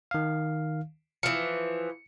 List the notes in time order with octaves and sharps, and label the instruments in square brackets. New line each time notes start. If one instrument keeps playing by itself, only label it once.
[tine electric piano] D#3 F5
[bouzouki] E3 F3 [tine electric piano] C#7